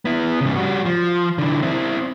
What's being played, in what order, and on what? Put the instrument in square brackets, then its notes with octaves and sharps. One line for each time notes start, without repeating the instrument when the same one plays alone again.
[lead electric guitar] B3 E4
G#2 C#3
G3 F#4
F3
D3 E3
C4 E4